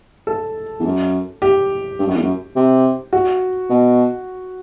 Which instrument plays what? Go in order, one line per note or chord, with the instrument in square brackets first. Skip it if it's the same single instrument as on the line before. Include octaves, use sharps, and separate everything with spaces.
[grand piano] A4
[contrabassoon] E2
F#2
[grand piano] G4
[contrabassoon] G2
F#2
E2
F#2
C3
[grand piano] F#4
[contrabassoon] B2